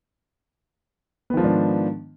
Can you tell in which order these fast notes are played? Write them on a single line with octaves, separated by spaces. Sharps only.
B3 D#3 F3 G#2 D4